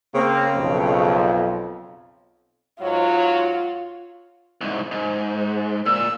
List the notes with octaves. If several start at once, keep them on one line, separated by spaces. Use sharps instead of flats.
C#3 A#3 C4
B1 F2
G#2 F#3 F4 C#5
C2 G#2
G#2
A#2 E6